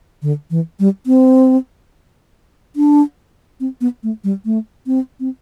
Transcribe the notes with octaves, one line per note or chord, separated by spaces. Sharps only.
D3
E3
G3
C4
D4
C4
B3
A3
G3
A3
C4
C4